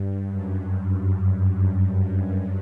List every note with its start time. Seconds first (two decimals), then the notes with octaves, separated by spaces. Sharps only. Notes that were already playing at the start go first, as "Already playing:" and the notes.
Already playing: G2
0.30 F#2